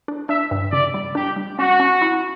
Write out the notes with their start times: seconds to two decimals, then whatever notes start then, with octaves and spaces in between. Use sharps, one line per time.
0.08 D4
0.29 D4 E5
0.51 G2
0.72 C#3 D5
0.94 G3
1.15 D4 G4
1.36 G3
1.58 C#4 F#4
1.80 C#4
2.02 E4